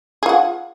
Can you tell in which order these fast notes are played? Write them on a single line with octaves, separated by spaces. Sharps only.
G#4 F4 F#5